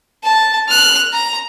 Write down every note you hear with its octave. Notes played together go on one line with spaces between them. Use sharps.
A5
F6 F#6
A#5